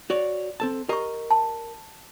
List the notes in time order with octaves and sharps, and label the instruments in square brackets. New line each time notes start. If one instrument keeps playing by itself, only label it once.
[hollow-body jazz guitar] F#4 C#5 D5
C4 A4 A5
[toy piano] G4 C#6 [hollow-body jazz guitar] A#4 D#5 A#5
[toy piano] A5